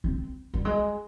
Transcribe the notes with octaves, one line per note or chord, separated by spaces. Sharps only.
C4
G3
G#3